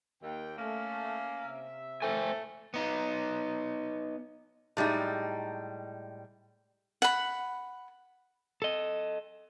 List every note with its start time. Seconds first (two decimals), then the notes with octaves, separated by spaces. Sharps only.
0.23 D#2 A#3 G5
0.59 A3 A#3 C#4
1.44 C3 E5
2.02 A2 A3 C5 G5 G#5
2.74 B3 D#4
4.77 A2 G3 G#3 D#4
7.02 F#5 B5
8.62 A4 D#5